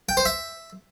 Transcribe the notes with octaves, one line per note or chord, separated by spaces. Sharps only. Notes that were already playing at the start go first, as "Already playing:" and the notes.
G5
C5
E5